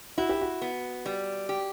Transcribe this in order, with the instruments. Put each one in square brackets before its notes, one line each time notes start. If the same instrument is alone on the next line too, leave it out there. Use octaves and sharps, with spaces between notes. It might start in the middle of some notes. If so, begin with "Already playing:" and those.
[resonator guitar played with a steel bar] E4 [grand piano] F#4
[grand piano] G4
F#4
[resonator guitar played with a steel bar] B3
G3
G4